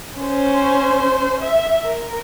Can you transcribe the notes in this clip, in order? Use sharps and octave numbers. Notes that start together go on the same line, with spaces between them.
C#4 C5
E5
A#4